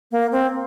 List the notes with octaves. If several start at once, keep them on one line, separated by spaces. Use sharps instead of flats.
A#3
C4